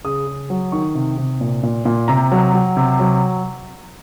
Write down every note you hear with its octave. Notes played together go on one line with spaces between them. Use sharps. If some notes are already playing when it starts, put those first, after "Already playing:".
C#3 D#6
C#3
F#3
D#3 C#6
C3
C3
A#2
A#2
A#2
C3 A#5
F#3
F#3
C3
F#3